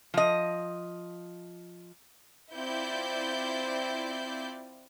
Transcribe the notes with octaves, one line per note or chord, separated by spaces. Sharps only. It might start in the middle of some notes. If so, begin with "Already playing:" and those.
F3 D#5
C4 E4 F4 D5 G6